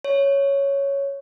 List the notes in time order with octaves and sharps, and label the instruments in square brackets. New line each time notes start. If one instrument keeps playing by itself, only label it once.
[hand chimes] C#5